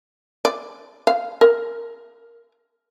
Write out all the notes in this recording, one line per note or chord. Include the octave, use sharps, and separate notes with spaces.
D5
F5
A#4